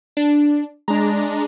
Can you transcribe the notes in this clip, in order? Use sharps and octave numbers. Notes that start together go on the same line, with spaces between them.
D4
G#3 D4 A#5